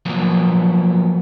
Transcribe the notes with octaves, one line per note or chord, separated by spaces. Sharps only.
F3 F#3 A#3 B3